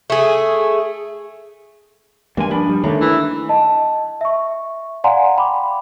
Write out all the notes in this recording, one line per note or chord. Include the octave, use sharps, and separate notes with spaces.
A3 G#4
G2 E3 G#3 A#3 G#5
F3 D4 B5
G3
D#3 A3 A#3 D4 C#5 A#5
E3
D#5 A5
E5 C#6
D5 F5 F#5 G#5 A#5 C6
G5 B5 D6